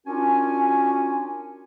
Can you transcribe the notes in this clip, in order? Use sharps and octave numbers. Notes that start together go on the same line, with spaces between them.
C#4 D4 F4 F#4 A#4 G#5